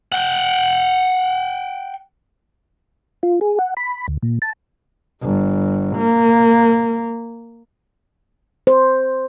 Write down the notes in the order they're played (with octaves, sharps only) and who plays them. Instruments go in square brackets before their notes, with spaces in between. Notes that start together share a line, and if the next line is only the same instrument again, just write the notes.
[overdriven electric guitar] F#5 G5
[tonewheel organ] F4
G#4
F#5
B5
D2
A#2
A5
[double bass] G1
A#3
[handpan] C5